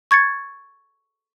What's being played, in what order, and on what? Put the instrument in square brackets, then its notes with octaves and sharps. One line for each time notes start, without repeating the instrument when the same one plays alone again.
[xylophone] C#6 G#6 A6 C#7